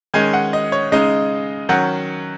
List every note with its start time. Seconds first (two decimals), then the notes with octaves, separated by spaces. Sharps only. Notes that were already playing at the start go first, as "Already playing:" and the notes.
0.14 D#3 G#3 C#4 G#5
0.33 F#5
0.53 D#5
0.72 C#5
0.92 C#3 G#3 D#4 D#5
1.69 D#3 F#3 C#4 F#5